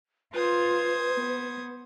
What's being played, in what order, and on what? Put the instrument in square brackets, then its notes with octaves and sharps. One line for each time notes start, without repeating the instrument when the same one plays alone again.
[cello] F4 [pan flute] B4 [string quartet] C5 D#6 G#6
[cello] B3